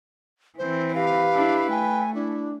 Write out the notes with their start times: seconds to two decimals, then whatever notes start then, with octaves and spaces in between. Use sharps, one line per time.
0.58 E3 C4 C5
0.95 G4 B4 F5
1.34 D4 E4
1.70 A3 G5 G#5
2.14 D4 E4